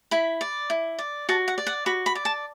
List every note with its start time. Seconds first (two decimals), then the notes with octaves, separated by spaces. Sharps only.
0.11 E4 B5
0.41 D5
0.70 E4
0.99 D5
1.29 F#4 A5
1.48 F#5
1.58 D5
1.67 F#5
1.86 F#4 B5
2.06 B5
2.15 D5
2.25 A5